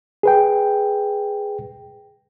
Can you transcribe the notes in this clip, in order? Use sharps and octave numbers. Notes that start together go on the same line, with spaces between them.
G#4 B4 G5